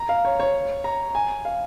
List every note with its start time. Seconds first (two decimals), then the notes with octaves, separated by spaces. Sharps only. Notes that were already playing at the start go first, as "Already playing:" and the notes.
Already playing: A#5
0.09 F5
0.25 C#5
0.40 C#5
0.84 A#5
1.15 G#5
1.45 F5